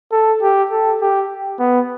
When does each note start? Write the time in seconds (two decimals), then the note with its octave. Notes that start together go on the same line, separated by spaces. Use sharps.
0.12 A4
0.42 G4
0.71 A4
1.01 G4
1.60 B3